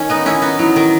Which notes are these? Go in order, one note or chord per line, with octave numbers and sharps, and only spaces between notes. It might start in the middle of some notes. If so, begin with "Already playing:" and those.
Already playing: D#3 C#4
B3 D#4
C#4 E4
B3 D#4
E3 F#3
D#3